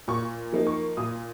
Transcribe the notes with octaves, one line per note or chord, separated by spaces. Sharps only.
A#2 C#6
F3 A#3 D#4
C#6
A#2 D#6